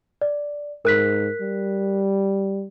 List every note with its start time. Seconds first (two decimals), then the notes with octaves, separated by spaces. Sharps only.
0.21 D5
0.85 G#2 A#4 F#6 B6
1.42 G3